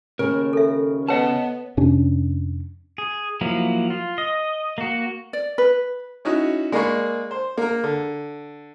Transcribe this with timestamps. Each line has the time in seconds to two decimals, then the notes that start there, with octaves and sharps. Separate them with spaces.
0.19 D#2 C#3 A#4
0.53 A4 E5
1.09 B3 B4 C#5 D#5 F#5 A5
1.77 F2 C3 C#4 D4
2.98 G#4
3.41 F3 F#3 A#3 E4
3.90 F4
4.18 D#5
4.78 A#3 F#4
5.33 D5
5.58 B4
6.25 C#4 D#4 E4 F#4
6.72 G#3 A#3 D5 B5 C#6
7.31 C5
7.58 A#3 A#4
7.84 D3